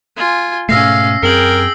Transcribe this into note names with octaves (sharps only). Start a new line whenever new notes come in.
F4 G#5
G#2 B2 A3 C#4 F5 E6 A#6 C7
F#2 C4 G#4 A#4 G5 C7 F#7